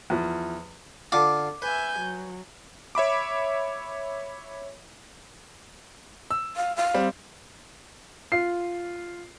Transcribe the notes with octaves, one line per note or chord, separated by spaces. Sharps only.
E2 F3
D3 F4 D6
B4 E5 G#5 G6
F#3
C#5 E5 B5 D6
E6
F5
F5
G3 C4
F4 C7